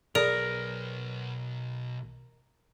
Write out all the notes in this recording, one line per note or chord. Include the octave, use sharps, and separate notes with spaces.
B1 G#4 A#4 B4 D5